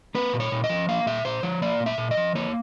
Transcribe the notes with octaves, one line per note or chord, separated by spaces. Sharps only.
A#3 B4
A#2
C#5
A#2
D#5
F3
A#3 F5
A#2 E5
A#2 C5
F3 C#5
A#3 D5
A#2
E5
A#2
D#5
F3
A#3 C#5